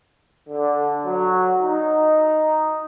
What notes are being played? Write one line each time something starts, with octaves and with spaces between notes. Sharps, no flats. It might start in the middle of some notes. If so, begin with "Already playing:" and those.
D3
F#3
D#4